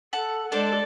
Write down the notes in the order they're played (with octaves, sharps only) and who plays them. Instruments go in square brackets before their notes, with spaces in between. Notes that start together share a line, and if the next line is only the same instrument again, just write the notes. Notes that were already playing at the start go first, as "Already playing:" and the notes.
[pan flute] A4 [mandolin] F#5 A5
[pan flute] G#3 [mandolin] D4 C5 [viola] A4 D5